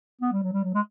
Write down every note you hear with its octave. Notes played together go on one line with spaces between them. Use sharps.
B3
G3
F#3
G3
F#3
G#3